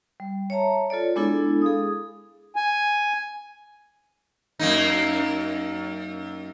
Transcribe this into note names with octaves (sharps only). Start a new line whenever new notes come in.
G3
C#5 E5 A5 A#5
F4 A4 C#5 D5
G#3 B3 D4 E4 G#4 A4
G#4 F5 D#6
G#5
F#2 A#3 D#4